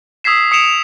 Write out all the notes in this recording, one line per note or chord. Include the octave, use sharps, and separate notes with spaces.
D#6 E6 G#6 B6 C7 E7
D#6 C#7 D7 E7 F7